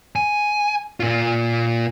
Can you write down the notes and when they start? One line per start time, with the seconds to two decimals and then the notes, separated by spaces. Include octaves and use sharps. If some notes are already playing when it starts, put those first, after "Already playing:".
0.16 G#5
1.00 A#2 F4